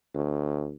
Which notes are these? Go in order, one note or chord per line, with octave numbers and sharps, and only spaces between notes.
D2